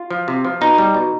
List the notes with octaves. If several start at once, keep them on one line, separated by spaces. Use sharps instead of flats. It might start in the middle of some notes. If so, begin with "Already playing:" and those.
Already playing: F4
F3
C3
F3
B2 D#4
G3
B2